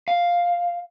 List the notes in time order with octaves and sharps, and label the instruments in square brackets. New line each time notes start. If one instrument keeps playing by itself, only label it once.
[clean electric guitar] F5